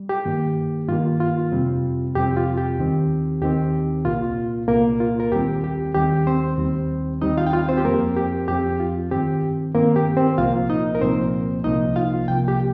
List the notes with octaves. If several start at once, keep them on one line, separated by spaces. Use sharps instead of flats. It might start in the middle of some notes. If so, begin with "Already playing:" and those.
Already playing: G3
G4
G2 D#3 A#3
G2 D#3 A#3 F4
F4
F2 C3 G3 C4
F2 C3 G3 C4 G4
F4
G4
D#2 D#3 C4
D#2 D#3 C4 G4
C2 A#2 A#3 F4
C2 A#2 A#3 A#4
F4
A#4
D#2 D#3 G3 C4 G4
G4
D#2 D#3 G3 C4 G4
C4 C5
D#2 D#3 G3 C4
D#2 D#3 G3 C4 D#4 D#5
F4 F5
G5
F4 F5
C4 C5
G4
F2 F3 A#3 C4 A#4
G4
F2 F3 C4 G4
F4
G2 D#3 C4 G4
G2 D#3 A#3 C4 A#4
G4
C4 C5
C2 A#2 F3 A#3 F4 F5
D#4 D#5
A#4
C2 A#2 F3 A#3 C4 C5
C2 C3 F3 A#3 D#4 D#5
F4 F5
C2 C3 F3 A#3 G5
G4 G5